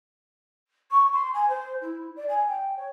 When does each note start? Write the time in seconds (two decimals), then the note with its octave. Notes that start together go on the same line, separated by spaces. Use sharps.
0.91 C#6
1.13 C6
1.33 G#5
1.48 C5
1.81 E4
2.16 D5
2.29 G#5
2.48 G5
2.77 C#5